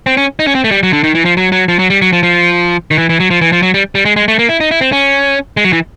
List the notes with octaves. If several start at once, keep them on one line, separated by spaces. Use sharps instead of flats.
C4
C#4
D#4
C#4
C4
A3
G3
F#3
D3
D#3
E3
F3
F#3
F#3
F3
F#3
G3
F#3
F3
F3
D#3
E3
E3
F#3
F3
E3
F3
F#3
G3
G3
G#3
G#3
A3
A#3
E4
D#4
E4
C4
C#4
G#3
F#3
E3